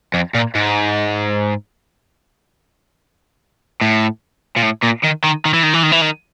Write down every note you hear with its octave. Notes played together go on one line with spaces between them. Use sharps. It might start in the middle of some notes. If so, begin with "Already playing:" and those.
F2
A#2
G#2
A2
A#2
A2
A#2
D#3
D#3
D#3
E3
D#3
E3
D#3
E3
D#3